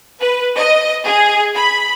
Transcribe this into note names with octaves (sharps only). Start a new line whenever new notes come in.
B4
D#5
G#4
B5